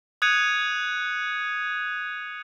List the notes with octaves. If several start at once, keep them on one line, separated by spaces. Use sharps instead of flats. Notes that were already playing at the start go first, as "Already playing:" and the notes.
D#6 F#6 G#6 C#7 D#7 F7